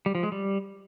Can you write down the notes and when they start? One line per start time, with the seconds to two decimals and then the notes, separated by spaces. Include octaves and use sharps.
0.06 G3
0.15 F3
0.23 G#3
0.32 G3